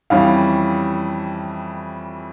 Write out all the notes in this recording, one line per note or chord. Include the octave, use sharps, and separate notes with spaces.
F2 E3 G3 C#4 F5